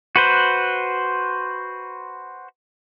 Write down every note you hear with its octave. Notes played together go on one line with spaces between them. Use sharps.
F#4 B4 C5